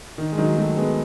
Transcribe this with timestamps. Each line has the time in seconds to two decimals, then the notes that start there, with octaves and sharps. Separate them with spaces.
0.18 D#3
0.32 G#3
0.38 D#3 F#3
0.57 F#3 A3
0.77 G#3 B3